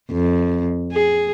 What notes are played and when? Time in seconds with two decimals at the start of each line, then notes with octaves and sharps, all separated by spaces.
0.11 F2
0.92 G#4